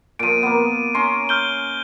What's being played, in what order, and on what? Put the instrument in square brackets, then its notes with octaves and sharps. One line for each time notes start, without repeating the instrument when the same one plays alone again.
[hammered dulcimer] A#2 F3 [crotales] D7 D#7
[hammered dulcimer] A#3 B3
C#4 A#5 C6
[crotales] F6 G6 G7